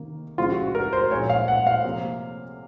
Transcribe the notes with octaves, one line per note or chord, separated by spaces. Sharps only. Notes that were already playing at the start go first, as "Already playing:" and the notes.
Already playing: C3 D#3 A#3
C#3 F3 G#3 C4 F4
F#4
F#4
A#4
C5
A#2 F3 G#3 C4 C#5
F5
F#5
F5
C3 F3 A#3